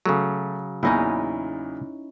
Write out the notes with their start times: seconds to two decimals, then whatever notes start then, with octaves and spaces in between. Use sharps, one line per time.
0.06 C#3 F#3 A3
0.83 E2 A#2 C#4 D#4 E4